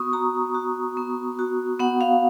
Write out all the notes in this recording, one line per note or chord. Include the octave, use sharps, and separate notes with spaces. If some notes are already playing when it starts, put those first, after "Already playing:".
Already playing: B3 F#4 C#6 D#6
F#4 A#5
F#4
B3
F#4
B3 F#5
F5